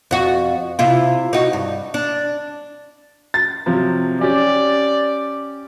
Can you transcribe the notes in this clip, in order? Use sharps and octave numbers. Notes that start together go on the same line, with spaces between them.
F2 F#4
C3 E4 F4
D#4 F#4
G2
D4
A6
C3 F3 F#3
C#4 G4 D5